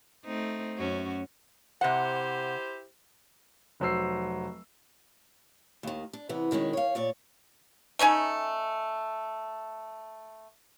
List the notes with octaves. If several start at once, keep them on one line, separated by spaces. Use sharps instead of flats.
A3 C4 D#4
F#2 C#4 F#4
C3 E4 G4 C5 F#5
F1 F#3 C5 E6 C7
D#2 D#3
D4
C3 E3 B3
B2 D#3 G#3 C#4
C#5 F5
A#2 C#5 D5
A3 C#4 D#4 G#5